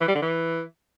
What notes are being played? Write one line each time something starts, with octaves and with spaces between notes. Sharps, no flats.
E3
G3
D3
E3